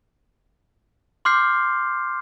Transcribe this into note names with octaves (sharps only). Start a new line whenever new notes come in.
C6 D6 F6 G6 C7